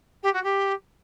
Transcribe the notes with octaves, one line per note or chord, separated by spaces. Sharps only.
G4
F#4
G4